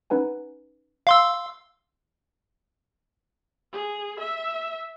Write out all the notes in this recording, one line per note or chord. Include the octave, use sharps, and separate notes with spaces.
C#4 D#4 B4 F#5 G#5
F5 C6 E6
G#4
E5